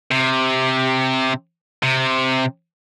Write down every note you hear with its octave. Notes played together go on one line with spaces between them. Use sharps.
C3
C3